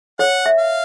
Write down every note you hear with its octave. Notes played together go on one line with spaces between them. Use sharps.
C#5 F#5
E5
F5